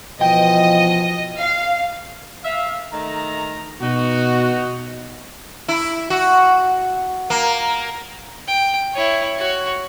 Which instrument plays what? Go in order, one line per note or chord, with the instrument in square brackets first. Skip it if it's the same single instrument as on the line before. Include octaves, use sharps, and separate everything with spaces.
[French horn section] B2 E3 F3 [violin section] D#5 [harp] G5
[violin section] F5
[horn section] E5 F5
D#3 A3 A#5
[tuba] B2 [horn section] D#4 F#4
[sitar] E4
F#4
A#3
[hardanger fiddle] G5
E4 C#5
F#4 C#5